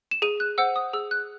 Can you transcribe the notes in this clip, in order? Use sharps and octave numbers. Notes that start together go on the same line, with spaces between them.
E7
G#4 D#7
F#6
C5 F#5 E6
D#6
G#4 E6
F#6